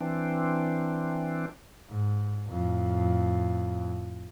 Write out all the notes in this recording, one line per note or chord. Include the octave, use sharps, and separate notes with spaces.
E3 C4 D4
G#2
F2 A2